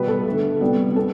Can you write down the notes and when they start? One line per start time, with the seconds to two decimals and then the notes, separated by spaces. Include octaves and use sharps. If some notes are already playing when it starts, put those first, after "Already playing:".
Already playing: B2 G3 B3 B4
0.08 A4
0.26 D3 A3
0.61 C3 G3 B3
0.96 B3 A4